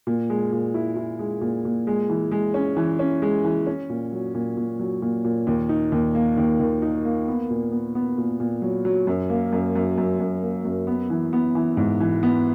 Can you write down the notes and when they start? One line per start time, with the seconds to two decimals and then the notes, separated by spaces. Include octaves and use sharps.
0.07 A#2
0.30 G#3
0.52 A#2
0.74 E4
0.96 E4
1.19 G#3
1.41 A#2
1.65 A#2
1.87 G#3
2.09 E3
2.32 G#3
2.54 C#4
2.77 E3
2.99 C#4
3.22 G#3
3.44 E3
3.67 C#4
3.90 A#2
4.12 F#3
4.34 A#2
4.57 A#2
4.79 F#3
5.02 A#2
5.24 A#2
5.47 D#2
5.69 D#4
5.92 D#2
6.15 A#3
6.38 D#2
6.60 D#2
6.82 D#4
7.05 A#3
7.28 B3
7.50 A#2
7.72 B3
7.95 B3
8.18 A#2
8.40 A#2
8.62 F#3
8.85 F#3
9.07 F#2
9.30 A#3
9.53 F#2
9.76 F#2
9.98 F#2
10.20 F#2
10.42 A#3
10.65 F#2
10.87 B3
11.10 E3
11.33 B3
11.55 E3
11.77 G#2
12.00 E3
12.23 B3